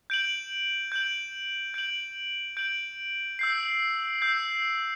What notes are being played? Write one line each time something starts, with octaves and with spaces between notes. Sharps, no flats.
G6 D7 F#7
G6 D7 F#7
G6 D7 F#7
G6 D7 F#7
E6 G6 C7
E6 G6 C7